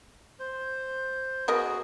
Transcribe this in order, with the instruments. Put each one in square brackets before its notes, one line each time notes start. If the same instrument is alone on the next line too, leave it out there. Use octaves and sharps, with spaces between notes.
[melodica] C5
[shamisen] B3 A#4 D#5 [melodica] F#4 G#4